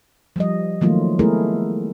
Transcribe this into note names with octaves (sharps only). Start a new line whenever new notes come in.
F3 G3 D#5
D#3 F3 F#3 A3 A#3 F4
G#3 A3 B3 E4 G#4 A#4